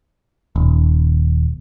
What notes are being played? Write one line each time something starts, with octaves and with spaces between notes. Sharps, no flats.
D#1